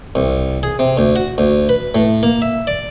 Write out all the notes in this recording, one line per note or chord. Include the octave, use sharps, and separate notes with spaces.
C2
G#4
C3
D2
F#4
D2
B4
A2
A#3
E5
D5